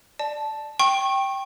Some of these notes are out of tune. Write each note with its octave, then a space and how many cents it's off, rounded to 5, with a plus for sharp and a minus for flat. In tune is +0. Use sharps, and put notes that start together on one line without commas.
D5 +15 A5 -10
G5 +0 C#6 -30